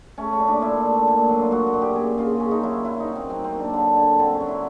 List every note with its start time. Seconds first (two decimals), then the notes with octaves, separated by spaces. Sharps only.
0.18 A3 C#4
0.33 C#4
0.40 A#2
0.48 D4
0.62 A#2 E4
0.85 A3
1.07 A#2
1.29 F#3
1.42 F4
1.51 A#2 F#4
1.67 F#4
1.74 A#2
1.82 G4
1.95 C#3 G#4
2.18 C#3 F4
2.40 C#3 C#4
2.51 D#4
2.63 F#3 E4
2.84 F#3 E4
3.00 D#4
3.07 A#3
3.15 C4
3.29 F#3 C4
3.44 C4
3.52 A#3
3.59 D4
3.74 D3
3.96 D3
4.19 D3 C4
4.34 C#4
4.40 F#3
4.48 E4